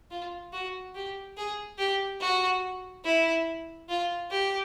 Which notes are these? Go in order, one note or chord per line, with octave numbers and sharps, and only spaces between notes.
F4
F#4
G4
G#4
G4
F#4
E4
F4
G4